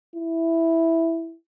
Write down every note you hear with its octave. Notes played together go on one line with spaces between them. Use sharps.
E4